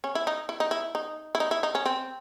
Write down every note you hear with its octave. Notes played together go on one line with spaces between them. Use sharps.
C#4
E4
D#4
E4
D#4
E4
D#4
E4
D#4
E4
D#4
C#4
C4